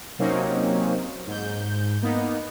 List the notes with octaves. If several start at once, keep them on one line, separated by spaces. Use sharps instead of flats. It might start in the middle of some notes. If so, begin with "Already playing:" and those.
C3 F#3 A#3 C4 C#4 D#4
G#2 G6
A#3 B3 D#4